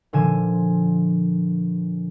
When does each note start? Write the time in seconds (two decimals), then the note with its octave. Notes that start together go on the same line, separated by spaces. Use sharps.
0.13 A#2 D3 F3 G#5 E7